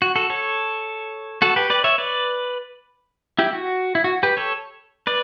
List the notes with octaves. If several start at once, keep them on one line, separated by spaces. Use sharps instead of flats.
F#4
F#4 A4
A4 C#5
F#4 A4
G4 B4
B4 D5
C#5 E5
B4 D5
E4 G4
F#4
E4
F#4
G4 B4
A4 C#5
B4 D5